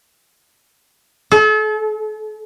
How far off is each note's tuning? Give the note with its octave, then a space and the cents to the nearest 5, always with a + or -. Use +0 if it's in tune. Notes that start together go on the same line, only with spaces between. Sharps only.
A4 -40